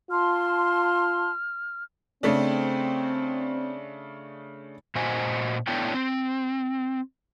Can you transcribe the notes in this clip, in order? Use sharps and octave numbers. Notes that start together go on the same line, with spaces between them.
F4 A5 C6 F6
C#3 A3 C4 D4
A#2 F#4 C5 D#5 G#5
A3 B3 D4 E4 C#5 G5
C4